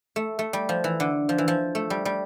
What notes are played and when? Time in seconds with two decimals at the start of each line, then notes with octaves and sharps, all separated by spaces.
0.16 A3
0.39 A3
0.53 G3
0.69 F3
0.84 E3
1.00 D3
1.29 F3
1.38 E3
1.48 F3
1.75 A3
1.90 G3
2.05 G3